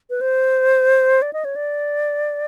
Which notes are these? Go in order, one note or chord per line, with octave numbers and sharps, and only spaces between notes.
B4
C5
D5
D#5
C#5
D5